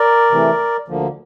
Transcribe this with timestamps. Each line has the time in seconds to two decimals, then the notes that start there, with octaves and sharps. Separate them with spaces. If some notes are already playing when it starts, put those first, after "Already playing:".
Already playing: A#4 D5
0.31 C3 E3 A3
0.88 D2 D3 F3 A#3